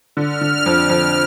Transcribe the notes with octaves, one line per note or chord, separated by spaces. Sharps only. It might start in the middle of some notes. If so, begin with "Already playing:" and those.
D3 F6
D3
F2
F2